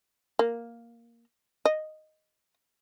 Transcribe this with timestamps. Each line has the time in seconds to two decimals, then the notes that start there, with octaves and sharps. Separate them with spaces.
0.39 A#3
1.65 D#5